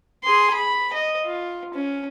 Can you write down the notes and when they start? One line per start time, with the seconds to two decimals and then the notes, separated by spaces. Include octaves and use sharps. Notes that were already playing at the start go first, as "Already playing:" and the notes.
0.24 G#4 C6
0.54 B5
0.93 D#5
1.25 F4
1.74 C#4